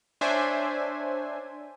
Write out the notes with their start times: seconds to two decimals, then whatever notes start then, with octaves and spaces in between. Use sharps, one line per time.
0.21 D4 C5 C#5 E5 G#5